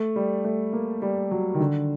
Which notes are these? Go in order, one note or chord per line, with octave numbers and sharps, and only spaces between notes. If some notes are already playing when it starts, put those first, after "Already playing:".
Already playing: A3
G3
A3
A#3
G3
F#3
D#3
D3